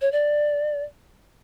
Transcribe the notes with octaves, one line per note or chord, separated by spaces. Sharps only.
C#5
D5